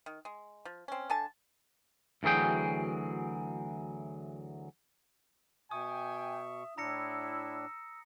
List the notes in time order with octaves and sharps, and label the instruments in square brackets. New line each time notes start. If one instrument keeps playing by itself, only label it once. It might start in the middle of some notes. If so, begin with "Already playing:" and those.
[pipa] D#3
G#3
F3
C4 C#4
D3 A4 G#5 A5
[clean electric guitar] D2 E3 F#3 G#4 G5
[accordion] B2 C#6 [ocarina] E5 [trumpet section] G5 G#5 [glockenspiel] D#6
[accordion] A2 D4 [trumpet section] E4 [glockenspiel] A#5 A#6 C#7 [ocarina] E6